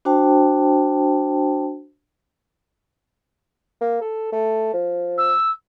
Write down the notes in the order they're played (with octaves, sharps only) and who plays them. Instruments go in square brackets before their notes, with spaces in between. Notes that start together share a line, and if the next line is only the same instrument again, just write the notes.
[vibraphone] D4 F#4 C5 G5 A5
[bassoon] A#3
A4
A3
F3
[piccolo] E6